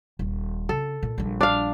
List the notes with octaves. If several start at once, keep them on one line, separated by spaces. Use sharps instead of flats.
D#1
C#3 A4
A#2
A#1 G3
D4 F5